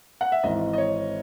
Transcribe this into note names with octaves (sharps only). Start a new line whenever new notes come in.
F#5
E5
G#1 G#2 E3 D#5
D#5
C#5